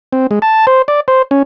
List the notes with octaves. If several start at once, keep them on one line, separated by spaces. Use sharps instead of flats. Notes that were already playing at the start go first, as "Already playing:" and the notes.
C4
G#3
A5
C5
D5
C5
C#4